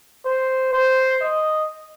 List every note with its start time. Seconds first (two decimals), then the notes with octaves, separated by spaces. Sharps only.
0.25 C5
0.73 C5
1.21 D#5